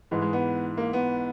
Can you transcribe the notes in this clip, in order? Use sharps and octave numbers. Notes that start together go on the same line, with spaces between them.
G#2 E3 G#3
G#3
B3
A#3
B3